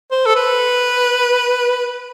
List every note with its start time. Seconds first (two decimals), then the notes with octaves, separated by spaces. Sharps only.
0.11 C5
0.26 A4
0.36 B4